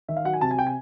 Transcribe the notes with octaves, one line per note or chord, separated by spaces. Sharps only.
D#3 E5
F5
F#3 F#5
G#5
C3 A5
G#5
G5
G#5